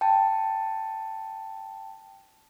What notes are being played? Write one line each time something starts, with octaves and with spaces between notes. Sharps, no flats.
G5 A5